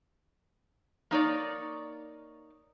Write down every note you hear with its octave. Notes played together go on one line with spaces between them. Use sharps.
A#3 D#4 C#5 D5